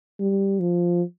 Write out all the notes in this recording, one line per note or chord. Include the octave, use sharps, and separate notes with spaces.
G3
F3